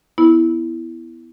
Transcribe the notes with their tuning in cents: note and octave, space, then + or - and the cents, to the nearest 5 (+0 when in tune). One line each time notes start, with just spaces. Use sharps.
B3 +5 E4 +0